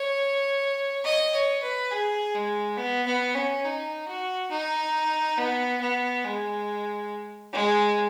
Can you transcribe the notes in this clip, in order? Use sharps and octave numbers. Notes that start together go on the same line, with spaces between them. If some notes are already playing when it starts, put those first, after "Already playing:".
Already playing: C#5
D#5
C#5
B4
G#4
G#3
B3
B3
C#4
D#4
F#4
D#4
B3
B3
G#3
G#3